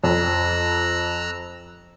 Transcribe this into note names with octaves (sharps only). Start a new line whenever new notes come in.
F2 A#5 E6 F#6